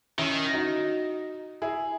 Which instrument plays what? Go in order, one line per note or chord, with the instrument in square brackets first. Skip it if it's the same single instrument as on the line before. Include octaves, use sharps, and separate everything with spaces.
[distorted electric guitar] D#3 [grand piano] C#4 E4
[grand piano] D#4 F#4
E4 G#4